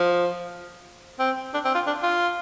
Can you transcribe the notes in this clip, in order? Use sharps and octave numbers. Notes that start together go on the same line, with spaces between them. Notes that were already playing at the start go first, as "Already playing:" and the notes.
Already playing: F3
C4
D4
C4
F4
D4
F4